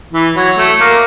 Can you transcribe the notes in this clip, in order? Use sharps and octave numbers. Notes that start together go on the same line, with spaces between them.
E3
F#3
A3
A#3